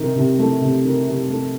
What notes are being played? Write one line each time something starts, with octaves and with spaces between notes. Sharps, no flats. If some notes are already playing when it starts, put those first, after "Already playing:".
Already playing: C3 D#3
C3
A3
C3
D#3
C3
A3